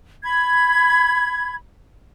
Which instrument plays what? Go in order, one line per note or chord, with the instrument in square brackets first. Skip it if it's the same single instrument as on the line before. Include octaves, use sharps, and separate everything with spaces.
[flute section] B5 G#6